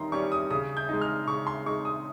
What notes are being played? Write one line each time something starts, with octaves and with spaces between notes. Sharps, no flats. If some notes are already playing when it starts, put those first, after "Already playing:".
Already playing: D#3 G3 C#4 A#5 C6
G3 C#4 C#6
D#6
C#3 D#6
G6
G#3 D#4
F6
C#3 C#6
C6
G#3 D#4 C#6
D#6